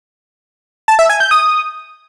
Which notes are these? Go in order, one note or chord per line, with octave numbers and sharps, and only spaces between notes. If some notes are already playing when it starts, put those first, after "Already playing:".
A5
E5
G#5
G6
D#6